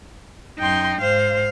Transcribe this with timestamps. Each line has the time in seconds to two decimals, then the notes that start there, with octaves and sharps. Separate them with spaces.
0.59 F#2 D#4 G5 C6
1.01 G#2 C5 F5